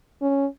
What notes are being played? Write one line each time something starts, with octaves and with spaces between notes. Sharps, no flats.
C#4